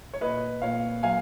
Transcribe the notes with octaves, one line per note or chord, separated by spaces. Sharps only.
C#5
A#2 B4 D#5
A#2 C#5 F5
F#3 F5 G#5